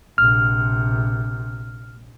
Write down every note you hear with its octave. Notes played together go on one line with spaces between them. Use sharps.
A#1 C3 F6